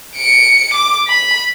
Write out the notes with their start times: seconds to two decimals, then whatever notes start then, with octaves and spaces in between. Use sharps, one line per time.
0.15 C#7 D7
0.74 D6
1.08 B5